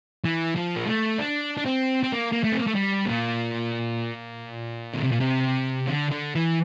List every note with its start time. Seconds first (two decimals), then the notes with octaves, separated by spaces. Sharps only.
0.24 E3
0.56 F3
0.76 A#3
0.87 A3
1.18 D4
1.57 D4
1.65 C4
2.03 C4
2.12 A#3
2.32 A#3
2.44 A3
2.52 C4
2.59 A#3
2.67 A3
2.75 G3
3.06 A#2
4.93 D3
5.03 C3
5.12 A#2
5.20 C3
5.87 D3
6.11 D3
6.35 E3